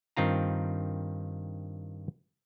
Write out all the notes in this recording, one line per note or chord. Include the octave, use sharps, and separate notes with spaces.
G2 D#3 C4 F4 A#5